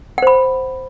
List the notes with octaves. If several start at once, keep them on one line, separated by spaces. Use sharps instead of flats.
C5 F#5 B5